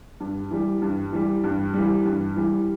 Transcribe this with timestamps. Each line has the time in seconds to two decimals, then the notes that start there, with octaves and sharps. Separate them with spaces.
0.20 G2
0.50 E3 G3
0.82 G2
1.12 E3 G3
1.44 G2
1.74 E3 G3
2.05 G2
2.36 E3 G3